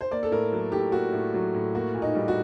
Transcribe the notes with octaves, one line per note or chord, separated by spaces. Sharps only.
C5
A#3 D5
A4
A2 A#4
F#3
A2 G4
A#3 F#4
A2
F#3
A2
A#3 F#4
A#2
D#4
G3
F#4